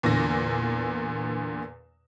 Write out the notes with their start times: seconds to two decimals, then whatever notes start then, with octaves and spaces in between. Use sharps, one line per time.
0.03 E2 A#2 D3 A#6